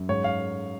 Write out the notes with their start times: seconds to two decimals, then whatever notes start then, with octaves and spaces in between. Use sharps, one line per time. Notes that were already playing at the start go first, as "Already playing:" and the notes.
Already playing: F#2
0.09 G#2 C#5
0.24 F5